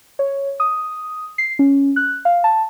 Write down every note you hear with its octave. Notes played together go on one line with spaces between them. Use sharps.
C#5
D#6
C7
C#4
F#6
F5
A5